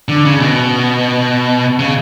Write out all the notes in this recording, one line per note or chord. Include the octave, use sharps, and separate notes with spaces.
D3
C#3
B2
C#3